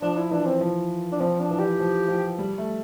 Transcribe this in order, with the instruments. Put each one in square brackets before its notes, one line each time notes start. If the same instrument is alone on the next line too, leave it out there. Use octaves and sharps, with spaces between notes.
[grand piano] F3 [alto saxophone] D4
[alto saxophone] E4
[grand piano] E3 [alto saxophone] D4
[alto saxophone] C4
[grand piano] F3
[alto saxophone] D4
[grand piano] F3 [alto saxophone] C4
[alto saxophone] D4
[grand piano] E3
[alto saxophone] G4
[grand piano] F3
F3
G3
A3